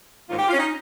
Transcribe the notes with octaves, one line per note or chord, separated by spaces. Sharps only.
G#2 D#3 A#3 C#4 F4
G4
F4
C#4
D#4